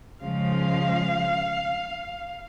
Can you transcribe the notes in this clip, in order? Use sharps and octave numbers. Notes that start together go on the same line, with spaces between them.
C#3 F3 G#3 F5